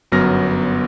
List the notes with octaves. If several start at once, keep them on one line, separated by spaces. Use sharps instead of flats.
G1 F#2 F#3 B3 F6 A#6